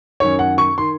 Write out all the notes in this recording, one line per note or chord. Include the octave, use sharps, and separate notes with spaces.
F#2 D#3 C#5
F#5
C#6
D#3 C6